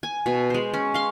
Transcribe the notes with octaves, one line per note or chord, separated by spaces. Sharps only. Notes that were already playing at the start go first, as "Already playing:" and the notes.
G#5
B2
G#3 C5
C#4
F5 C6